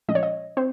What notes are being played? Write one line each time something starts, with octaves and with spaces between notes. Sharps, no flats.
A#2 F3 G#3 C#4 D#5
C#5
D#5
C4 C5